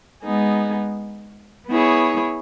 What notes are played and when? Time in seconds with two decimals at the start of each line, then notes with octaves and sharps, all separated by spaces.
0.22 G#3 B3 D#4 G#4
1.68 B3 E4 G#4 C#5